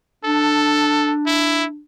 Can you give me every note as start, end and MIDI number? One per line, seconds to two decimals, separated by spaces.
0.24 1.81 62
0.24 1.13 69
1.27 1.64 64